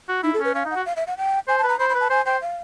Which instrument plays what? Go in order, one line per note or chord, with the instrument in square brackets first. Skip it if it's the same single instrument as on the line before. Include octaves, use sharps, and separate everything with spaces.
[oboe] F#4
[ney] D#4 [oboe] E4
[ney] A4
[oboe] C#4 [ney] B4
[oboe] C#4 [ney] F5
[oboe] D#4
[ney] F#5
[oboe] F#4
[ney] F5
E5
F#5
G5
[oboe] C5 [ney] G#5
[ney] A5
[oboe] B4
[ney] A#5
[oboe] C5 [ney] B5
[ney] B5
[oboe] B4
[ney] A5
[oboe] C5 [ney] G#5
[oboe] C5 [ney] G5
[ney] F5